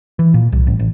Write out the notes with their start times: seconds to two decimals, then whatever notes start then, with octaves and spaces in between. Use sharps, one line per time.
0.19 E3
0.34 A#2
0.52 C2
0.67 A1
0.79 A1